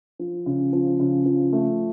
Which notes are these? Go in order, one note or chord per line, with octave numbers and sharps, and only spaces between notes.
F3
C#3
F3
C#3
F3
A3